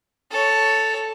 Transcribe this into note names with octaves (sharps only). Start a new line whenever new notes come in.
A4 C#5